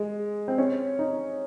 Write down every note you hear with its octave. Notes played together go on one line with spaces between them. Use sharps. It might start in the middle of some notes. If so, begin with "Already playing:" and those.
Already playing: G#3
C4
C#4
D#4